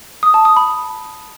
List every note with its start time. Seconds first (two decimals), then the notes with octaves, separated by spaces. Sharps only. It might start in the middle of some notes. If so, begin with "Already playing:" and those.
0.23 D#6
0.34 A5
0.45 D#6
0.56 B5